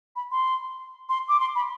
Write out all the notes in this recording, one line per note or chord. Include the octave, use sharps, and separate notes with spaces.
B5
C6
C6
D6
C6
B5